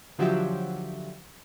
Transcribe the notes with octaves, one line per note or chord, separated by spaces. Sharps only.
D3 F3 F#3 F#4 G4 E5